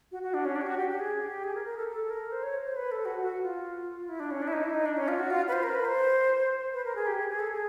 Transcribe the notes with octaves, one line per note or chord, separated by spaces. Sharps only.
F#4
F#4
D4
C#4
D4
G4
F#4
G4
G4
G#4
G4
G#4
A#4
A#4
A4
A4
A#4
C5
C#5
C5
B4
A4
F#4
F#4
F4
E4
D4
C#4
D4
E4
D#4
E4
D#4
D4
C#4
F4
F#4
F4
B4
C5
A#4
B4
C5
B4
A#4
G#4
G4
G#4
G#4
A4
G#4